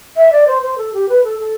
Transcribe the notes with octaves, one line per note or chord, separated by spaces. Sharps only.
E5
D5
C5
C5
A4
G4
B4
A4
A4